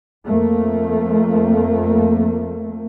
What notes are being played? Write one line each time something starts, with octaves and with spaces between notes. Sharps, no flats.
F2 A3 A#3